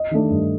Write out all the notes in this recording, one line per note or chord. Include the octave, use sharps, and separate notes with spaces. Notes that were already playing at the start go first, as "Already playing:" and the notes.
Already playing: D#5
D#3 A3 D4
G2